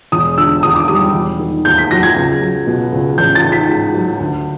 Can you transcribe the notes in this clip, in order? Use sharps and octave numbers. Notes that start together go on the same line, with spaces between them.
E1 D#6
D3 E6
D#2 D#6
D6
G3 D#6
E1
D#3
D#2 G6
B6
F#3 A#6
G#6
C#2
F#3
B2
C#2
A1 G6
A6
D#3
B6
G#2
F#3
D2